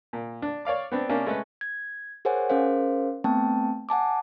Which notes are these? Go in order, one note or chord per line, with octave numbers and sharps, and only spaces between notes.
A#2
D4
C#5 D5 F5 D6
B3 C4 D4
C3 A#3 C#4 D4
G#3 A3 C#4 A4 B4
G#6
G#4 A#4 C5 C#5 F#5 G#5
C#4 G#4 A#4 C5 F5
A3 B3 C4 G5 A5
F#5 G#5 A5 D6